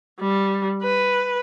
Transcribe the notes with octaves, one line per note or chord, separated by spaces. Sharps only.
G3
B4